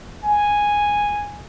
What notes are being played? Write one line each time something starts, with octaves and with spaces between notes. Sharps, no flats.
G#5